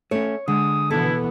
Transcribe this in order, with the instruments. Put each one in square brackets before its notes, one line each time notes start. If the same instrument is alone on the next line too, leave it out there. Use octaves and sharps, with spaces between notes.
[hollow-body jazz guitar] A3 C#4 [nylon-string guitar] C#5
[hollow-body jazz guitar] D3 [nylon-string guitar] G#3 [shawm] D#6
[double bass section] B2 E3 B3 [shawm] E4 [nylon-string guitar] A4